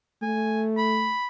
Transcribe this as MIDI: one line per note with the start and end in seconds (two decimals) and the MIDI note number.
0.22 1.14 57
0.22 0.63 80
0.78 1.28 83